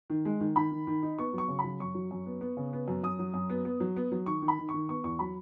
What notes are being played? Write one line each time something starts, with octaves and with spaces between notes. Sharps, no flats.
D#3
G#3
D#3
D#3 B5
D#3
D#3
D#4
B3 C#6
F#3 C#6
C#3
B5
F#3
F#2 C#6
F#3
F#2
B3
B3
C#3
B3
F#2
F#2 D#6
F#3
F#2
B3
B3
F#3
B3
F#3
D#3 C#6
D#3
B5
D#3
C#6
D#3
B3 C#6
E2 C#6
F#3 B5